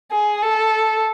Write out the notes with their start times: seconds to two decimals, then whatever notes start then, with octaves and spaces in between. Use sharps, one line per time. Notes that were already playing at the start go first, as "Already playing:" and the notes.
0.11 G#4
0.43 A4